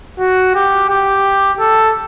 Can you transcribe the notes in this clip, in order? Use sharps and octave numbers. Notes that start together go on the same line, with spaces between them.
F#4
G4
G4
A4